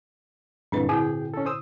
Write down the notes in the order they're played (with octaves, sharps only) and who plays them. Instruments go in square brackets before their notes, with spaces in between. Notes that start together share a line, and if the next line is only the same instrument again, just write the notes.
[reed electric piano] G2 D3 E3 [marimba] A#2 C4 B4
[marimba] G#2 D3 E4 [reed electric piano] G#4 G5
[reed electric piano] C#4 A4
C5 D#6 E6